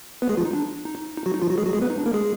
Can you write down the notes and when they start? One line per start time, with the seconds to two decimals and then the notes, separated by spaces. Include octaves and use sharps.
0.22 B3 B4
0.29 G#3 G#4
0.37 F3 F4
0.45 D#4
0.53 D4
0.85 D#4
1.17 D#4
1.26 F#3 F#4
1.34 D#4
1.42 F3 F4
1.50 F#3 F#4
1.58 G#3 G#4
1.66 F#3 F#4
1.73 G#3 G#4
1.81 B3 B4
1.90 D#4
1.98 D4
2.06 A#3 A#4
2.13 G#3 G#4